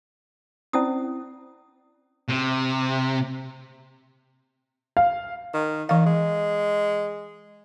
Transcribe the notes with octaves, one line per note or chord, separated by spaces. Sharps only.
C4 C#4 E4 C5 D5 D#6
C3
F5
D#3
D#3 E3 F5
G#3